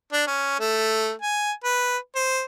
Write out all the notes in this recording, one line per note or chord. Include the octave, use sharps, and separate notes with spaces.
D4
C#4
A3
G#5
B4
C5